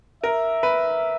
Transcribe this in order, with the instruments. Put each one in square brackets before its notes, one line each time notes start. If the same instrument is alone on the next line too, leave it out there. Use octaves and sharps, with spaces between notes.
[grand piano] A#4 [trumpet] E5
[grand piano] B4